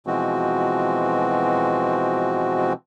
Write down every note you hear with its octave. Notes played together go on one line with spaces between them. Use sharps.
B2 E3 F3 G#3 C4 F#4